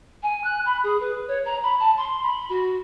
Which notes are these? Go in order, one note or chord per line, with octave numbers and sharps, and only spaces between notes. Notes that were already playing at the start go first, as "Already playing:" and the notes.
G#5
F#6
B5
G#4
B4
C#5
A#5
B5
A5
C6
B5
F#4